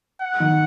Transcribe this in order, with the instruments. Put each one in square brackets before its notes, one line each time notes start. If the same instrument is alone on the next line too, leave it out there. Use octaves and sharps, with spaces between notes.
[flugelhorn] F#5
[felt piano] D#3